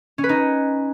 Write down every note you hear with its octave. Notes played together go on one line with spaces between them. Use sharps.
C#4
B4
D#4